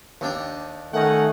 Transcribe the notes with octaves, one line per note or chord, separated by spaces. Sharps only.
D#2 D4 G5
D#3 A3 C#4 D#4 F#5